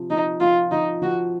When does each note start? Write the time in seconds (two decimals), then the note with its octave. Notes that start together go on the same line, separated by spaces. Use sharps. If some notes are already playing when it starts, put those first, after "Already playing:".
Already playing: C3 F3
0.10 F3 D#4
0.41 F3 F4
0.71 F3 D#4
1.02 F3 F#4